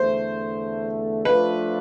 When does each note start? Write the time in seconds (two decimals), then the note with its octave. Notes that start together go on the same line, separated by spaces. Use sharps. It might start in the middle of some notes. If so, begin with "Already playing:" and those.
Already playing: E2 D3 A3 C5
1.25 F3 A3 D4 F4 B4